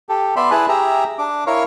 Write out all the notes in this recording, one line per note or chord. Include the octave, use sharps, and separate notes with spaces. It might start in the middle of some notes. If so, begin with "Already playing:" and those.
G4 A4
B3 D5 E5 B5 C6
E4 G#4 B4 G#5 A5 F#6
G4 G#4 E5 A#5
D4 D6
E4 A#4 C#5 F5 C#6